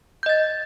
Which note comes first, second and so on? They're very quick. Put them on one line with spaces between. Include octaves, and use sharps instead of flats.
G6 D#5 A6